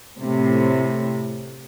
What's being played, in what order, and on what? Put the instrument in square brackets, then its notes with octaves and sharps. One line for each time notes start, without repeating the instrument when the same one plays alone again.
[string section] A2 C3